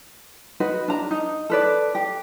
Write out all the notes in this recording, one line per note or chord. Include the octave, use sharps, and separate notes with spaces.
D#4 F#4 B4
D4 A#5
D#4
A4 B4 D5
G4